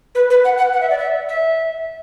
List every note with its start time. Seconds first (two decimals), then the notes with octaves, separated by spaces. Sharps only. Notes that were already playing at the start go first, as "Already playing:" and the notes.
0.15 B4
0.30 B4
0.45 F#5
0.58 F#5
0.73 F#5
0.81 E5
0.90 D5
0.99 E5
1.29 E5